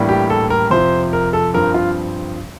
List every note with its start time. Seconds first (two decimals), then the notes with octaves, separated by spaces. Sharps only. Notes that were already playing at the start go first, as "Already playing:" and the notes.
Already playing: A2 E3 G3 A#3 D4
0.09 G4
0.30 A4
0.50 A#4
0.71 F2 C3 F3 C5
1.13 A#4
1.33 A4
1.54 G2 F3 C4 A#4
1.74 F4